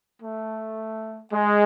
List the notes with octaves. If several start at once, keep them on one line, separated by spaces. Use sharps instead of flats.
A3
G#3